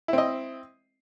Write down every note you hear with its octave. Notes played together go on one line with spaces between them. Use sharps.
C4 E4 D#5